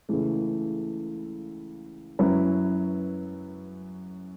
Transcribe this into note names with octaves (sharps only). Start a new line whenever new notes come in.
C#2 C#3 E3 A3
F#2 F#3 C#4 E4 B4